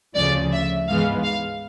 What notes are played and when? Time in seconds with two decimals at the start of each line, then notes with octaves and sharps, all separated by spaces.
0.15 D2 C#3 F3 D5
0.52 E5
0.87 G#2 E3 G#3 B3 F5
1.24 F5